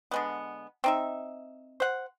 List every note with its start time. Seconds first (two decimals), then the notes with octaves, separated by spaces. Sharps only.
0.11 D3 G#3 B3
0.84 C4 D#4 E5
1.80 C5 F#5